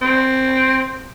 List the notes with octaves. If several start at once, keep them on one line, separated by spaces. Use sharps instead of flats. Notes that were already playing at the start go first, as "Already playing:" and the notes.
C4